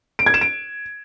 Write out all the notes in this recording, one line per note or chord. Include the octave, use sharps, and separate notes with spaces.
D7
G#6
E7
D7